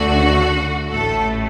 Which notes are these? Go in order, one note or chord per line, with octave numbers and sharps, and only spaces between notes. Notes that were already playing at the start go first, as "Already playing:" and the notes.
Already playing: D2 D3 A3 F#4
A1 A2 A3 A4